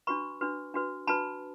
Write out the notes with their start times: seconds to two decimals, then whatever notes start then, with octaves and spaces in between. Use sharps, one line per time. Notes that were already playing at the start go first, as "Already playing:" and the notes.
0.07 D4 F#4 B4 B5 C#6
0.41 D4 F#4 B4
0.74 D4 F#4 B4
1.07 D4 F#4 B4 A5 B5